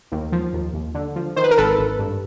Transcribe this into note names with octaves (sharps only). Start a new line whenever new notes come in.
D#2
F3
D#2
D#2
D3
F3
D#3 C5
B4
A#4
G#1 A4 B4
G#1
G2